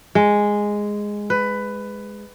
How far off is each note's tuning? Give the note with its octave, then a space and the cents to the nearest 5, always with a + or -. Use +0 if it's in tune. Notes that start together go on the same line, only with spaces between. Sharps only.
G#3 -5
B4 +15